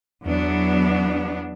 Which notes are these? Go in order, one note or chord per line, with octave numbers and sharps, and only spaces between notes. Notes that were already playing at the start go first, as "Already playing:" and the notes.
E2 F#3 B3 D4